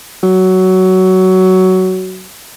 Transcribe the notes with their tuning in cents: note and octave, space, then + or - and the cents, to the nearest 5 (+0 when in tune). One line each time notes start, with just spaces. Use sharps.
F#3 +15